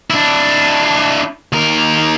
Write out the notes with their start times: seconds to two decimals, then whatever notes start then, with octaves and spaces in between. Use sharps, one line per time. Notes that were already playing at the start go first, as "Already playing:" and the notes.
0.10 D4 E4
1.53 D#2 A#4